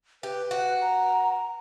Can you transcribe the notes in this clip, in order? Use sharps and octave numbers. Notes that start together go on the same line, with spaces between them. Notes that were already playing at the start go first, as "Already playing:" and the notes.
G4 B4
F#4
A#5